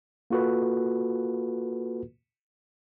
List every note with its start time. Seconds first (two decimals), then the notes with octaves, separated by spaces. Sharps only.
0.30 A#3 F4 F#4 A4 B4